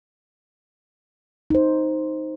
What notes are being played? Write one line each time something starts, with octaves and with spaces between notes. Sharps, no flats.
D#4 C5